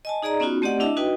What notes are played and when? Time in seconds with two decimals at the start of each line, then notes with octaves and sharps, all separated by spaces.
0.05 D#5 G#5 A5
0.22 D#4 G#4 D5 D#5 A#5
0.40 B3 C#4 D#4 F4 F#4
0.62 A3 C4 G4 D5 D#5 F#5
0.80 D4 E4 D#5 E5 A5
0.97 D#4 F#4 B4 D#5 G5